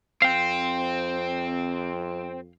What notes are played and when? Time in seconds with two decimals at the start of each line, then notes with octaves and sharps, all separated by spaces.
0.22 F2 C4 F5 G5